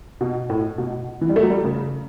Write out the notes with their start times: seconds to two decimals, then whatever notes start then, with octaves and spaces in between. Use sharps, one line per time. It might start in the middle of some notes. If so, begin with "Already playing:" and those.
0.21 B2
0.50 A2
0.78 B2
1.21 E3
1.29 G3
1.36 A3
1.43 F#3
1.50 G3
1.65 C#3